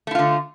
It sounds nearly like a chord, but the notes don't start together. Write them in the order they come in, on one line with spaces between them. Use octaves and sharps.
A3 E4 F4 D3